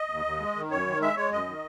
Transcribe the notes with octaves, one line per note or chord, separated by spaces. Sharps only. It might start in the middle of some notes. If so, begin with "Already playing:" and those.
Already playing: D#5
D#2
D#2
G#3
D#3
F#2 C#5
D#3
G#3 E5
G#3 C#5
F#2 D#5
D#3